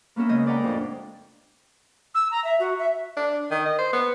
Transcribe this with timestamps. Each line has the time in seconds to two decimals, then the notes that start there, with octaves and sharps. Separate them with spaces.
0.16 A#3 B3 C#4 A#4 E5
0.29 C#3 G#3 D#5 G6
0.46 B4 D5 D#5 F#5 G5 A#5
0.64 F2 A2 D4
2.15 E6
2.31 A#5
2.44 E5
2.60 F#4
2.79 E5
3.17 D4
3.51 D#3
3.65 D#5
3.78 C5
3.93 B3